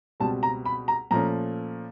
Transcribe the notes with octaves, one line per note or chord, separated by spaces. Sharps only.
C#2 B2 G3 C4 A5
A#5
B5
A#5
A#2 F3 A3 C#4 A#5